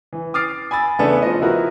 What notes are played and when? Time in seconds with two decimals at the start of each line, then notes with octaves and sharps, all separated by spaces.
0.13 E3
0.34 D6 D#6 F6 A6 C7 D7
0.71 G#5 B5 E6 A6
0.99 C#3 E3 A3 B3 D4 A4
1.22 F3 D#5
1.42 F3 E4 F#4 A#4 B4